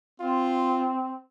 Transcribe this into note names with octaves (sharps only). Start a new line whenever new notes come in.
C4 F4